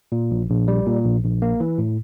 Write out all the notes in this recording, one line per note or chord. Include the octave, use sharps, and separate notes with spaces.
A#2
A#1
A#1
G3
A#2
A#1
A#1
A#3
E3
A2